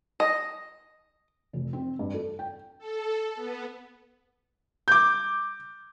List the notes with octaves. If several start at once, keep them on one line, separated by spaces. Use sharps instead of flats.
D#5
F1
C4
G2
A4
G5
A4
B3
D6 G6